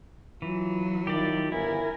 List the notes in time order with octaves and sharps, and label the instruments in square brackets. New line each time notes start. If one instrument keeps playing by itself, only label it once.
[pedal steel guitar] E3 [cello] F#3 [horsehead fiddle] F4
[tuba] D#3 [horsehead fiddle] E4 F4 [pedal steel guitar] G4 D5
[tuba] G1 [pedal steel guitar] E4 [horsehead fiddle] A#4 G#5